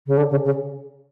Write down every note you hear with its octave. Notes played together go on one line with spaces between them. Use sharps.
C#3
D3
C#3
C#3